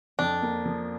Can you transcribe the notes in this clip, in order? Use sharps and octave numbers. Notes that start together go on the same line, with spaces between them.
F2 D4
A#3
F3